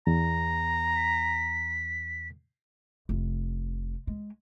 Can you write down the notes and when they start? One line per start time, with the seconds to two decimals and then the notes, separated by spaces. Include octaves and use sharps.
0.07 E2 A#5
0.96 B6
3.09 F1
4.07 G#3